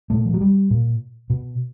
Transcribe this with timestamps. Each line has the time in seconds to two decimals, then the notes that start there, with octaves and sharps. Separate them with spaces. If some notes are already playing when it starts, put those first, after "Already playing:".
0.10 A#2 A3
0.25 F3
0.34 F#3
0.41 G3
0.71 A#2
1.30 B2